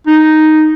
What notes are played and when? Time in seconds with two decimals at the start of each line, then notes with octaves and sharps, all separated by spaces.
0.07 D#4